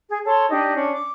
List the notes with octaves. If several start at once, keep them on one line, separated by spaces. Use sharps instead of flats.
G#4
A4 C#5 A5 C6
D4 D#4 G4 D#5
C#4 D4
D6